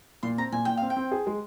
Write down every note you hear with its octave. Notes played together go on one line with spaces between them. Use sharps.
A#2 C6
C4 A#5
A#2 G#5
A#2 G5
C4 F5
G5
C4
G#4
G#3